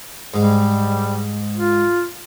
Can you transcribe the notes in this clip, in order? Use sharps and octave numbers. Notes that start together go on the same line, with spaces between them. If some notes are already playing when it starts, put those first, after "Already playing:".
G#2 G3
F4